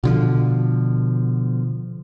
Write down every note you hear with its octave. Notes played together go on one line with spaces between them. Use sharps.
B2 D3 F3